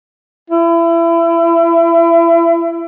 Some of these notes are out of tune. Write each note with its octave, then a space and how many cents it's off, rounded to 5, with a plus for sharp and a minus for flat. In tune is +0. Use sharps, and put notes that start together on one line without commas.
E4 +30